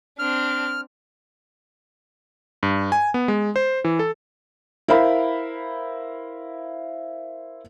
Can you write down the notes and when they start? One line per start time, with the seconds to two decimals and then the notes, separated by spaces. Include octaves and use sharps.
0.19 C4 D4 F6
2.63 G2
2.92 G#5
3.14 B3
3.28 G#3
3.56 C5
3.84 E3
3.99 A4
4.88 E4 A#4 C5 F5 B5